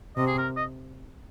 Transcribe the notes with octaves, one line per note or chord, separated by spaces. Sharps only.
C3 D#5
G#4
A#4
D#5